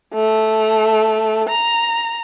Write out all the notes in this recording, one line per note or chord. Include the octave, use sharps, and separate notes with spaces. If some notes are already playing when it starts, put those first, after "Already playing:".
A3
A#5